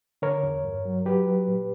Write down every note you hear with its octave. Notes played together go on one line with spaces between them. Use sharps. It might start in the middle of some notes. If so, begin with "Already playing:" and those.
D3 A#4 C#5
E2
G2
F#3
F#3 G4 B4
F#3
A#2